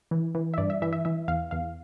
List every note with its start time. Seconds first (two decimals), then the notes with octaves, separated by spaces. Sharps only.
0.11 E3
0.35 E3
0.54 E5
0.58 G2 D5
0.70 E5
0.82 E3 E5
0.93 E5
1.05 E3 E5
1.28 E2 F5
1.51 E2 F5